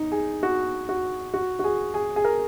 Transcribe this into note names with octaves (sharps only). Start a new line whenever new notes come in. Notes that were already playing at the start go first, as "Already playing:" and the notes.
Already playing: D#4
G#4
F#4
F#4
F#4
F#4
G#4
G#4
G#4
A#4